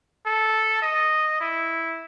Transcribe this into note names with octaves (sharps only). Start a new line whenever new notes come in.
A4
D#5
E4